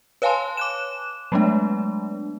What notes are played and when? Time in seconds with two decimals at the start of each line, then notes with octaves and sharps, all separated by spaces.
0.22 B4 C#5 F5 G#5 A5 C6
0.57 D6 F#6 E7
1.32 F#3 G#3 A3 B3 D4